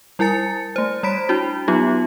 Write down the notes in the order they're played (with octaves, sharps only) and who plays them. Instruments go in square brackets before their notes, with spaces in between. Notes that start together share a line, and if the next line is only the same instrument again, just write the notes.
[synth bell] G3 E4 A#4 G#5 A6 C#7
A3 C5
G3 C#5 B5 B6 D7
D4 E4 F#4
F#3 B3 D#4 F4 G4